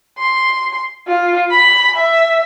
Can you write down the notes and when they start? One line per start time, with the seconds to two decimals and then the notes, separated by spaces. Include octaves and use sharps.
0.19 C6
1.08 F4
1.51 B5
1.97 E5